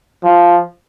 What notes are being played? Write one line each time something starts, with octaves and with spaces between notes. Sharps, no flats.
F3